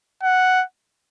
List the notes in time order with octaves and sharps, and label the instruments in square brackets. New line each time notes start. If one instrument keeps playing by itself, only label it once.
[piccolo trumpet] F#5